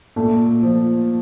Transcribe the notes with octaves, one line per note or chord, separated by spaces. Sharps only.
A#2 A3 A4
F3